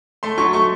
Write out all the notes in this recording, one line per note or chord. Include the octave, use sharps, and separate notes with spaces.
A3 C6
F#3 C#6
A3 C#6